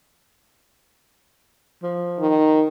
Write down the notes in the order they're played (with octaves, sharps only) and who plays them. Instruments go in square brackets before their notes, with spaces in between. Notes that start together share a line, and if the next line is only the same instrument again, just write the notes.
[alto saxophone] F3
[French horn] D#3